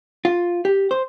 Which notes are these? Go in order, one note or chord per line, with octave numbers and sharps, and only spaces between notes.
F4
G4
C5